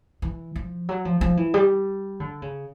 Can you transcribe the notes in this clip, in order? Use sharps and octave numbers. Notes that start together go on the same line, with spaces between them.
E3
F3
F#3
F3
F3
E3
G3
D3
C#3